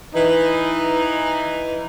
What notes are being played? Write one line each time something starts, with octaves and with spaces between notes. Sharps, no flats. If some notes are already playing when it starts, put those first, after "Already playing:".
E3 D#4